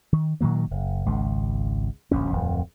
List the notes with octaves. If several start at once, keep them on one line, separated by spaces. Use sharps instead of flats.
D#3
A#2 D#3 F#3 A#3
F#1
G#1 C#2
D1 A#1 F#2 C#4
D1 F2